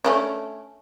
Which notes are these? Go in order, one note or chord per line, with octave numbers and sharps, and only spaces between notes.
A3 C#4 D4